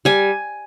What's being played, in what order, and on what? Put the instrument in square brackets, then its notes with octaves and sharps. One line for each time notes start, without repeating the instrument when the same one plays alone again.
[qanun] G3 G#5